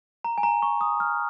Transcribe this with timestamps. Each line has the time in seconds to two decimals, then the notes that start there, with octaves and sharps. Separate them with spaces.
0.24 A#5
0.38 G#5
0.43 A#5
0.62 C#6
0.81 D#6
1.00 F6